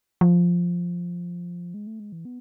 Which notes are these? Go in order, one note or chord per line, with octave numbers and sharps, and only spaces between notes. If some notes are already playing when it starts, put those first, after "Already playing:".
F3
G#3
A3
G#3
E3
B3